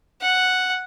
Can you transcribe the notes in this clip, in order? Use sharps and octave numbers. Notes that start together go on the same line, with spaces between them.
F#5